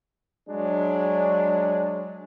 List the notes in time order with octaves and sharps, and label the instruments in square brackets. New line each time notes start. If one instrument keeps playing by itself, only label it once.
[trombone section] F#3 G#3 D4